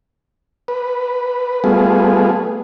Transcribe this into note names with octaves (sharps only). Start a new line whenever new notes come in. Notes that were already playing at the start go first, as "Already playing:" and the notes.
B4
G3 A3 B3 F4 G#4